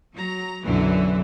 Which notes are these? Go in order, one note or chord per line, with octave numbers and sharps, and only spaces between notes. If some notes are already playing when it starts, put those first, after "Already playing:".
F#3 A#5
B1 F#2 D3 E3 F#3